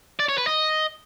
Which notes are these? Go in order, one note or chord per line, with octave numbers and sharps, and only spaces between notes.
D5
C#5
B4
D#5